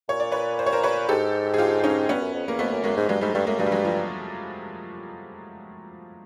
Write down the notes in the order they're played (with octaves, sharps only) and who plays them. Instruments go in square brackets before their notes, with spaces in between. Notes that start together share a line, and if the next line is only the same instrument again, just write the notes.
[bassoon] A#2 [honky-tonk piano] C#5
[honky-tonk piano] D5
B4 C#5
C5
C#5
A#4 C5
B4 C#5
[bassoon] G#2 [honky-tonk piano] G4 A4
[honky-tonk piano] G#4
F4 G4
C#4 D#4
[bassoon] G2 [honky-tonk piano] B3 C#4
[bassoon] F#2
F2
[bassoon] E2 [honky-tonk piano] A#3
[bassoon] F2 [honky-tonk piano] A3 B3
[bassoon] F#2
[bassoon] F#2 [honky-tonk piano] G#3 A#3
[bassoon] G#2
[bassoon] G2 [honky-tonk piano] F#3 G#3
[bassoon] G#2 [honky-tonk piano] G3 A3
[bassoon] G2 [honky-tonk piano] G3 A3
[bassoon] F#2 [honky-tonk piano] G#3 A#3
[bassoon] G2 [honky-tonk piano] F#3 G#3
[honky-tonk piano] G3
F#3 G#3
F3 G3